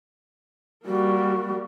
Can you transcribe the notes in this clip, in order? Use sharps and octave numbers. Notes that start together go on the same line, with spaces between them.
G3 A#3 F#4